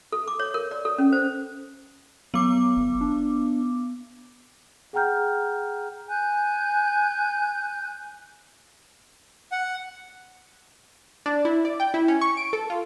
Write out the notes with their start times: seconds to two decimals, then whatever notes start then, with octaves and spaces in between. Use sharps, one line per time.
0.12 A4
0.28 D6
0.40 C#5
0.54 A#4
0.71 D5
0.85 A4
0.98 C#4
1.12 C5
2.34 F#3 B3 D6
2.77 G1
3.01 D4
4.93 G#4 F#5 G5 A#5 F6 G6
6.08 G#5 F#6 G6
9.52 F#5
11.26 D4
11.45 E4
11.65 D5
11.80 G5
11.94 E4
12.08 C#4
12.21 C#6
12.37 D7
12.53 A4
12.70 F4